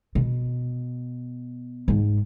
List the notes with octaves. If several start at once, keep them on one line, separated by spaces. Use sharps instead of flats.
B2
G#2